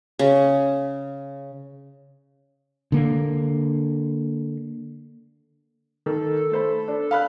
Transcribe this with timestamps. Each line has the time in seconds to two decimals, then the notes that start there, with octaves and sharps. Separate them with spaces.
0.19 C#3
2.92 D3 A#3
6.06 D#3 A4
6.52 A3 C5 B5
6.88 D4
7.11 F5 B5 F#6